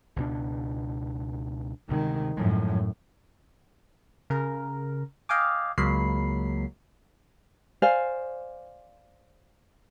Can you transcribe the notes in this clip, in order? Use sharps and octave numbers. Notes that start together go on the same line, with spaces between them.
C#2 B2 D4
D2 C3 D#3 G#3
F#2 A2 F3 G#3
C#3 A#4
D#5 F5 G5 G#5 D6
C#2 F#3 G#3 A#3 B5 C7
C5 D5 F5 G#5